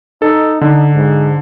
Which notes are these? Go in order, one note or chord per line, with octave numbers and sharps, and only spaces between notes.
D#4 A4
D3 D#4
G#2